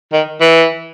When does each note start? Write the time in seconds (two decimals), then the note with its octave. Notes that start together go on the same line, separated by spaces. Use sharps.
0.13 D#3
0.41 E3